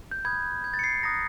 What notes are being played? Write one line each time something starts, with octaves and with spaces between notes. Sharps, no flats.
G6
B5 D#6 F#6 G#6
G#6
A6
C#7
C7
A#5 D#6 F#6 A#6